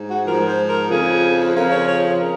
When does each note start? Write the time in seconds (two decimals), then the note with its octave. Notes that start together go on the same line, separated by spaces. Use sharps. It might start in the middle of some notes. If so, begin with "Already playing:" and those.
Already playing: G#2
0.08 F#4
0.24 G#2 F3 A#4
0.47 C5
0.68 A#4
0.89 F2 C#3 F3 G#4
1.54 F2 C#3 F3 A#4
1.70 C#5
1.86 C#5
2.19 C#3 A#4